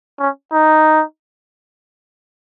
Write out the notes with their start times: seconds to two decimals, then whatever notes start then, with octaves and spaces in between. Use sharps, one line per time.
0.19 C#4
0.53 D#4